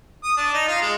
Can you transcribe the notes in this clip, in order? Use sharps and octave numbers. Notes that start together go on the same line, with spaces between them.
D#6
D4
D#4
F4
G#3